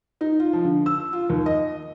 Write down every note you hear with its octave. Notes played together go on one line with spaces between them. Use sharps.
D#4
F4
F3
D3
E6
F4
D#2
D#5